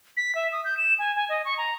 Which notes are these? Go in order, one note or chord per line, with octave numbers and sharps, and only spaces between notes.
B6
E5
D#6
G6
E7
G#5
G#5
D#5
C#6
A#5